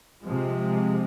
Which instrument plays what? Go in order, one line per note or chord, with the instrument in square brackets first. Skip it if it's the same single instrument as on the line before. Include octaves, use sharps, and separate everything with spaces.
[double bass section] C3 F3 G#3